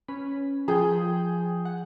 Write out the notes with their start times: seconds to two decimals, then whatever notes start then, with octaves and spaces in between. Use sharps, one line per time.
0.08 C#4 B4 B6
0.68 F3 G#4 G5 G6
1.65 F#5